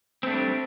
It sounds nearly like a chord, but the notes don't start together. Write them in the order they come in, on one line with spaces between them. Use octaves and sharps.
C4 A3 D4 G3